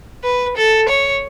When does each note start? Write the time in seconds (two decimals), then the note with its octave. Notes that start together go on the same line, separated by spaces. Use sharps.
0.24 B4
0.57 A4
0.89 C#5